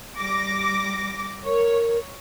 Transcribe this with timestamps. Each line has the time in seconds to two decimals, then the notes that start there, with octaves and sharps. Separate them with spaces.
0.17 G3 D6 A#6
1.45 A#4 C#5